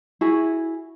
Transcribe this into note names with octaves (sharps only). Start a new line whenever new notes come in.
E4 F#4 G#4 E5